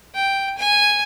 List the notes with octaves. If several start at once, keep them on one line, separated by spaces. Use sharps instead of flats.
G5
G#5